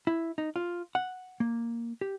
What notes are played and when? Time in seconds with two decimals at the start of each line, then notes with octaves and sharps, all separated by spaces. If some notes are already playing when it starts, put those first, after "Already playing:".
0.07 E4
0.38 D#4
0.56 F4
0.95 F#5
1.40 A#3
2.01 G4